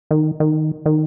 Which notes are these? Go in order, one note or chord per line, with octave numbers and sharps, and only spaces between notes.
D#3
D#3
D#3